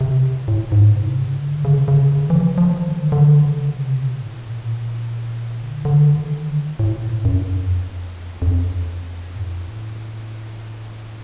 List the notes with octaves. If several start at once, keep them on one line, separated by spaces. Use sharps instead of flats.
C3
A2
G#2
C3
C#3
D3
C#3
C#3
D3
E3
F3
F3
D#3
D3
D#3
D3
C#3
C3
B2
A2
A#2
D3
D3
D#3
D3
A2
A#2
F#2
F2
F2
A2